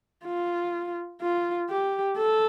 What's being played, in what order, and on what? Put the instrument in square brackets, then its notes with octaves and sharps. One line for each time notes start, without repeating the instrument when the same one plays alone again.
[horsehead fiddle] F4
F4
G4
A4